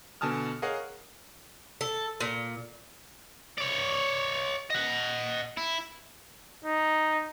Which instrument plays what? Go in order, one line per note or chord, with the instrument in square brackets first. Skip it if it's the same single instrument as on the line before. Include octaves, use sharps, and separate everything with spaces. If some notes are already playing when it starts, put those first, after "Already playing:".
[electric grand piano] B2 D3 G#5 A5 D#6 F6
G#4 A#4 C#5 D#5 F5 F#5
[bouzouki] A4
A#2
[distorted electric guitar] C#5 D5
D#5 F#5
E4
[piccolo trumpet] D#4